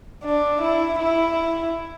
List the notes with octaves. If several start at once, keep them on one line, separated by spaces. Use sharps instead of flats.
D4
E4
E4